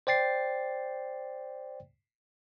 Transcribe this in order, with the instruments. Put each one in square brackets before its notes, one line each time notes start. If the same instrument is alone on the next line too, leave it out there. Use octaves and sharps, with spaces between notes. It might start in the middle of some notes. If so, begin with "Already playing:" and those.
[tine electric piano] C5 D5 G5 A6 C7